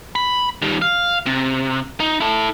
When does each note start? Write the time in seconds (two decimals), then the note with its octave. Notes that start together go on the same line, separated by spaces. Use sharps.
0.16 B5
0.62 D#3 G3
0.82 F5
1.26 C3
2.00 D#4
2.20 E4 A4